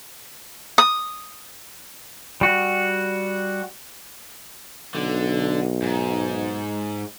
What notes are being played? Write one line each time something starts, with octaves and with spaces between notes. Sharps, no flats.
D#6
G3 F#4
B1 D3
G#2